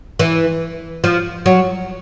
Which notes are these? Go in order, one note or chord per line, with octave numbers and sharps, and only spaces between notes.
E3
F3
F#3